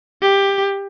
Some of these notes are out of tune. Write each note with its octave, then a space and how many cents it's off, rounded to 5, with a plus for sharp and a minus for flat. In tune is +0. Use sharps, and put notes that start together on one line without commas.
G4 +15